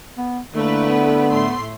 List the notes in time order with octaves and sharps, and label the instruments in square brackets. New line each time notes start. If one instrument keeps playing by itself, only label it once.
[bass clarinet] B3
[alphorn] D3 [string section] A3 E4 B4 [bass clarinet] A#3
[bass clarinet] B3
[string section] A2 A3 C6